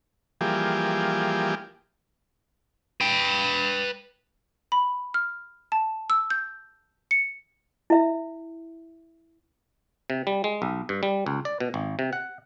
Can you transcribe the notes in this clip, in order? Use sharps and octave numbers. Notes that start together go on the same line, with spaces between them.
E3 F3 G3 A#3 G4 G#4
B4 G5
B5
F6
A5
E6
G6
C#7
E4 E5
C3
G3
G#3
B1
G2
G3
C#2
D5
B2
G#1
C3
F#5